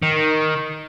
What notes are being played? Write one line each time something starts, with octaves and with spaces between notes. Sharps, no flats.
D#3